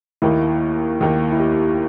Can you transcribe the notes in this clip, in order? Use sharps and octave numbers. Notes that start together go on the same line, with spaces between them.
D#2 D#3 A#3 E4
D#2 D#3 A#3
E4
G4